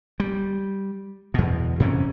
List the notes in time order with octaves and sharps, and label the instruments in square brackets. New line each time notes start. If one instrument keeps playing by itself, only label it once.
[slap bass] G3
E2 B2
F2 C3 E3 C#4